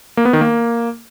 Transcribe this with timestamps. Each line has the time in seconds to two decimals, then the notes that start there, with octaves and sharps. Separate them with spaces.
0.17 A#3
0.25 B3
0.33 D#3
0.41 A#3